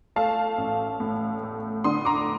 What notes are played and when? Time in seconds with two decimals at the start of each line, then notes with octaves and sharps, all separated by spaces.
0.16 A3 F5 A5
0.58 A1
1.00 A2
1.43 A3
1.84 D3 C6 D#6
2.05 A#5 D6